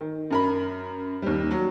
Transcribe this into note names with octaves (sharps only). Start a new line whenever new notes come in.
D#3
F#2 A#4 B5
D#2 G3
F#3